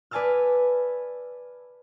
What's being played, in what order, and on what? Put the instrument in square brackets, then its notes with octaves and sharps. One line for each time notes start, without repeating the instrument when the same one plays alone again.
[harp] B4 D5 G#5 A5 E6 F6